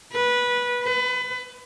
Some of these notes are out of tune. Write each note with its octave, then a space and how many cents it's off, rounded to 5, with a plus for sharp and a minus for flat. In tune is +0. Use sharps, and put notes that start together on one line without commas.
B4 -15
B4 +30